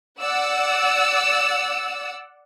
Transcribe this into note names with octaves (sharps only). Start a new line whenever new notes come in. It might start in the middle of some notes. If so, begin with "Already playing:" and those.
D5 F#5 E6